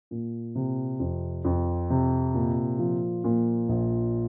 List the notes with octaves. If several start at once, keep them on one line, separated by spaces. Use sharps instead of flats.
A#2
C3
F2
F2
C3
A#2
F3
A#2
A#1